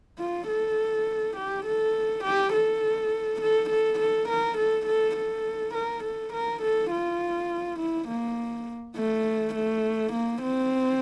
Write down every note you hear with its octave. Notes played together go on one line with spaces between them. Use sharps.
F4
A4
G4
A4
G4
A4
A4
A4
A4
A#4
A4
A4
A4
A#4
A4
A#4
A4
F4
E4
A#3
A3
A3
A#3
C4